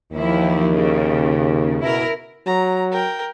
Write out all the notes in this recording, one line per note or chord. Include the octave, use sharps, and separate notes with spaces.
D#2 E3 F3 E4
C#3
B2 E4 A#4
F#3 A#5
A#4 G5